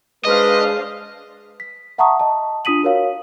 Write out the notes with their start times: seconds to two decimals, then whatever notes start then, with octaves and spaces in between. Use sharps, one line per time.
0.25 G#3 D4 B4 C5 D#5 F5
1.60 B6
1.98 E5 F#5 A5 A#5 C#6 D#6
2.20 D#5 A5
2.65 D4 F4 D#6 B6 D#7 F#7
2.83 F#4 A#4 C#5 F5